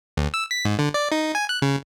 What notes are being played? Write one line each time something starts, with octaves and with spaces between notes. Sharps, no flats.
D2
E6
B6
G#2
D3
D5
D#4
G#5
F#6
C#3